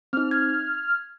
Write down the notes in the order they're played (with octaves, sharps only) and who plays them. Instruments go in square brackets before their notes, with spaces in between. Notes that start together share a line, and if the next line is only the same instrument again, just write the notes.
[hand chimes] C4 D#4 [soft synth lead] F6
[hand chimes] G#6